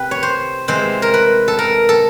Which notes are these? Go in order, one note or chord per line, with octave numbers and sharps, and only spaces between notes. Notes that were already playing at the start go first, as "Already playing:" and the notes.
Already playing: C3 G4 B4
C#5
C5
C3 E3 G#3 C5
A#4
B4
A4
A#4
A4